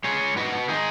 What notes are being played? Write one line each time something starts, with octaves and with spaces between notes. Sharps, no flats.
G#3 G#4 C#5
G#3
G#2 F#4 B4
B3
D#3 D#4 G#4